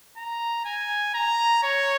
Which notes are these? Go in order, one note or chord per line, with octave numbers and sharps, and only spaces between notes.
A#5
G#5
A#5
C#5